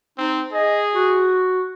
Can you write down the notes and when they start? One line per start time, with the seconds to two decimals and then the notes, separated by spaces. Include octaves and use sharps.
0.18 C4 D#4
0.52 G#4 D#5
0.94 F#4